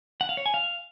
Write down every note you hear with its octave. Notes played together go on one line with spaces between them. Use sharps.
F#5
F5
C#5
G#5
F5